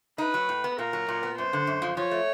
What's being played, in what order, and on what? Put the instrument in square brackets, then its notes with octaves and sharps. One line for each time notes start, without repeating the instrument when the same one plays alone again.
[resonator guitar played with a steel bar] D#4 [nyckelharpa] B4
[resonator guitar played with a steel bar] F#3
A2
B3
[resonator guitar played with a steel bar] A#2 [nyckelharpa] A#4
[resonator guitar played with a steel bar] F#3
A#2
B3
[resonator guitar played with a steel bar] F#2 [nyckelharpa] C5
[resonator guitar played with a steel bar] D3
F#2
F3
[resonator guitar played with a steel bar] F3 [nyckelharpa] C#5
[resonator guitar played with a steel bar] A3